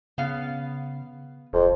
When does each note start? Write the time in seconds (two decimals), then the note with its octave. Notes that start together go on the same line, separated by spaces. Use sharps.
0.18 C#3 B3 F5
1.53 D1 F2